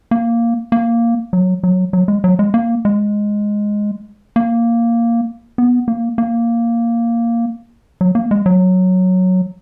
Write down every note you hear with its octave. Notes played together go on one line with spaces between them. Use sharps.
A#3
A#3
F#3
F#3
F#3
G#3
F#3
G#3
A#3
G#3
A#3
B3
A#3
A#3
F#3
A#3
G#3
F#3